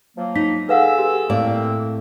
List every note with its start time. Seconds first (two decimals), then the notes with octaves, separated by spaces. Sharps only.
0.17 F3 F#3 A#3
0.36 D#4 B6
0.69 G#4 A4 B4 F5 F#5 E6
0.98 G4
1.30 A2 A#3 C4 D5